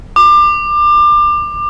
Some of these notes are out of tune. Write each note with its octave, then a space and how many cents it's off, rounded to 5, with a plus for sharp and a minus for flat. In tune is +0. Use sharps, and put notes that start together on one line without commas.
D6 +25